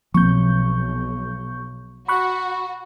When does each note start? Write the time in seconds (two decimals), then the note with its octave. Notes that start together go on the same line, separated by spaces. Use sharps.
0.14 B1 F3 A#3 C4 C#6 G6
2.08 F#4 B5 C#6 F#6